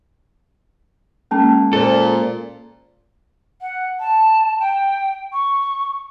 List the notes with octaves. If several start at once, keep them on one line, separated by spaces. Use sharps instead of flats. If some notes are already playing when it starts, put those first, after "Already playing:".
G#3 A#3 C#4 G#4 A5
A#2 G#4 A4 C5
F#5
A5
G5
C#6